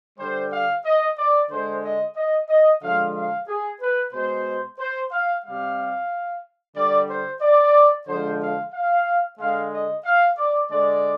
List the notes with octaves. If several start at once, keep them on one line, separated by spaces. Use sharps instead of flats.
D3 G3 C5
F5
D#5
D5
D3 G#3 C5
D#5
D#5
D#5
D3 F3 G#3 F5
F5
G#4
B4
B2 G#3 C5
C5
F5
C3 G3 F5
D3 G3 D5
C5
D5
D3 F3 G#3 C5
F5
F5
D3 G#3 F5
D#5
F5
D5
D3 G#3 D5